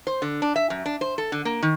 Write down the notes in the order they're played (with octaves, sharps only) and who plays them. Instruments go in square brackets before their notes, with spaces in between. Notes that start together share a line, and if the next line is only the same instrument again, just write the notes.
[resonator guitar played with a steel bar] C5
D3
D4
E5
F#2
D4
C5
A4
D3
A#3
D#3